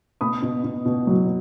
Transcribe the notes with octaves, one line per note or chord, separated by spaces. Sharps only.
B2 B5 D#6
B2
B2
B2
F#3